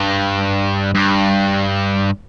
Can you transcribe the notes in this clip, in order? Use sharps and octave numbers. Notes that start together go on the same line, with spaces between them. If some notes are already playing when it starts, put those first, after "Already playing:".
Already playing: G2
G2